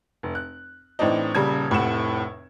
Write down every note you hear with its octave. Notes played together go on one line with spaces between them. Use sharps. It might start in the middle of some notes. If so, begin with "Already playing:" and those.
F1
F#6
A2 E3 C4 D4 D#4
D#1 C#3 G3 G#6
F1 A2 C3 F#5 E7